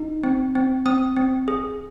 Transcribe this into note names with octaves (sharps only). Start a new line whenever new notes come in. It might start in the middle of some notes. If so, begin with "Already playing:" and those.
Already playing: D#4
C4
C4
C4 D#6
C4
G#4